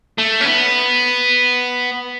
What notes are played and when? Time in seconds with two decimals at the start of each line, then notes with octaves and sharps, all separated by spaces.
0.18 A3
0.41 C#4
0.45 B3